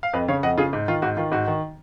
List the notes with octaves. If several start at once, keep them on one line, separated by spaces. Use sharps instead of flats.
F5
F2 B4 D#5
C#3 C#5 F5
F2 D#5 F#5
C#3 F4 G#4
G#2
D#3 F4
G#2 F#4
D#3 F4
G#2 F#4
D#3